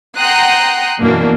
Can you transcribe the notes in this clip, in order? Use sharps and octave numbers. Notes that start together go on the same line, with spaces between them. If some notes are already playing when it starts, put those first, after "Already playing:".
F#5 G5 A#5 C6 D#6 F#6
F#2 B2 E3 A#3 D4